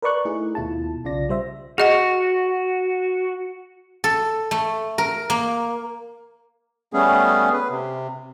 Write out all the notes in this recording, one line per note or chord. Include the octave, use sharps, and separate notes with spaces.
A#4 B4 D5 C#6 F#6
A3 D#4 E4 G#4
D#2 B2 E4 F4 A5
B1 C#3 F4 D5 A#6
G3 C5 E5
F#4 G#4 D#5 F#5
A4
A3
A#4
A#3
G3 A3 B3 C#4 G#4
B4
C3